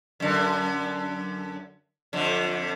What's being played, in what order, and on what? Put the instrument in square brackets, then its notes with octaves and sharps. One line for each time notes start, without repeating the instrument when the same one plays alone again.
[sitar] F#2 D3
F2 D3